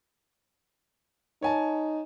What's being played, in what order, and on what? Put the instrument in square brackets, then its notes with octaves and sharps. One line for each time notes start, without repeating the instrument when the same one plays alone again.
[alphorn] D#4 [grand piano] C#5 G#5 A5